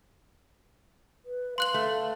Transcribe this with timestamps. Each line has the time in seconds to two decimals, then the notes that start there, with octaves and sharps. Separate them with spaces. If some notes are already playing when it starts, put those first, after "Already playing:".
1.25 B4
1.58 F5 C6 F#6 F#7
1.74 A3